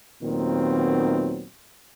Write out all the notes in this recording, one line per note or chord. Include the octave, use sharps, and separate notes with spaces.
D#2 A#2 D#3 F#3 B3 C4